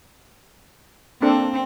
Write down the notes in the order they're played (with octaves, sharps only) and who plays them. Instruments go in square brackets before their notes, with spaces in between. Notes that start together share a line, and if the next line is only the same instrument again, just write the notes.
[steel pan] A#3 D4 A4 [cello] C4